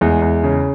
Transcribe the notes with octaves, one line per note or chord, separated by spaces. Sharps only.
E2 G#3
E2
C#3